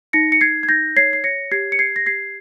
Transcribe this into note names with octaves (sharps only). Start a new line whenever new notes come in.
D#4 A#6 C#7
C#7
D#4 G#6 C7
G#6
D#4 G6 A#6
C#5 G#6 C7
C7
C#5 A#6 C#7
G4 G#6 C7
C#7
G4 G#6 C7
A#6
G4 G#6 C7